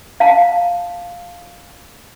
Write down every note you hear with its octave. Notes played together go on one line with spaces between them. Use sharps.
F5 A5